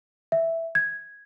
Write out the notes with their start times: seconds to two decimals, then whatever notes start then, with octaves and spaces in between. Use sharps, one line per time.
0.32 E5
0.75 G#6